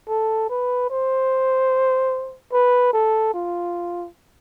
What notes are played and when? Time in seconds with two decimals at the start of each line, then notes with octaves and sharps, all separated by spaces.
0.09 A4
0.50 B4
0.90 C5
2.53 B4
2.93 A4
3.34 F4